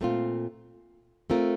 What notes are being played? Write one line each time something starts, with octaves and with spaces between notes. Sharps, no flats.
A#2 A3 C4 F4
A3 C4 F4 A#4